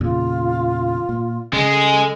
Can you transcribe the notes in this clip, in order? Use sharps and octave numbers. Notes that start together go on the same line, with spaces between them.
E2 A#2 C#3 F4
A#2
C#3 G#3
A4